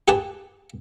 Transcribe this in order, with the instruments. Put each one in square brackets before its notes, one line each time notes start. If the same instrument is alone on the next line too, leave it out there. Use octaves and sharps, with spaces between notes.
[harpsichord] G4 G#4 B4 G#5 A5